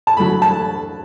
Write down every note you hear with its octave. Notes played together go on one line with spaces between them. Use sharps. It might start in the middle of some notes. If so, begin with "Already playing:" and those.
A5
D3 F#3 A3 B5
A5